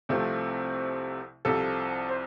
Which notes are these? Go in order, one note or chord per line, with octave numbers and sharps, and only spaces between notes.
C2 C3 F3 A3 C4
C2 C3 F3 A4
C5